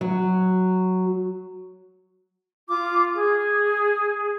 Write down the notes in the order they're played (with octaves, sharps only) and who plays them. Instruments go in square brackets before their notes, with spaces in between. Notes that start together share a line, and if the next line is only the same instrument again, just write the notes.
[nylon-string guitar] F#3
[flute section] F4 D6
G#4